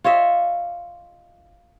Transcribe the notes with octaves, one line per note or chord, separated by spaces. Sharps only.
F4 C#5 D#5 E5